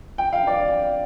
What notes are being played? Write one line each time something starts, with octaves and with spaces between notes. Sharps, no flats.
G5
F5
D5